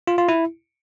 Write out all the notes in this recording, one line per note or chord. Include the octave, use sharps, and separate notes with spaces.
F4
F4
E4